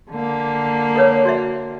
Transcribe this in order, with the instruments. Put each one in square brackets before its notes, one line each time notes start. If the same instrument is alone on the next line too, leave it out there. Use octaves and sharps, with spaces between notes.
[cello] D3 A#3
[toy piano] A4 B4 C#5
F#4 D5 E5